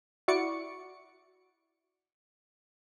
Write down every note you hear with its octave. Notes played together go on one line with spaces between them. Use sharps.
E4 F#4 D5 C#6 D6 C#7